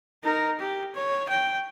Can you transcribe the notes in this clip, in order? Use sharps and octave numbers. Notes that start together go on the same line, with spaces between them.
D#4 A#4
G4
C#5
G5